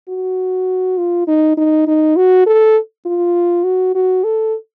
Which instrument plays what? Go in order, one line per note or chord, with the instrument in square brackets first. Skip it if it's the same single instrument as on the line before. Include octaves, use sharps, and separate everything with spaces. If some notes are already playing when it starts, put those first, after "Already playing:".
[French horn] F#4
F4
D#4
D#4
D#4
F#4
A4
F4
F#4
F#4
A4